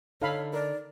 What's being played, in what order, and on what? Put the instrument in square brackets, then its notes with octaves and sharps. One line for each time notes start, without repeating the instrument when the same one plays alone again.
[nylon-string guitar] D3 D#4 [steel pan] A4 F5 B5 [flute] C#5
[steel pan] A#4 [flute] D5